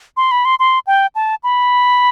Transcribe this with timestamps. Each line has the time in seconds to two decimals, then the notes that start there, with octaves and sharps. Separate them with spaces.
0.17 C6
0.31 B5
0.45 C6
0.59 C6
0.87 G5
1.15 A5
1.44 B5